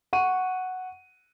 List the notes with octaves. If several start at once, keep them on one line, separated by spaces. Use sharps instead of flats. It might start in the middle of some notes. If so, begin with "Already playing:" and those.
F#5 C#6 D#7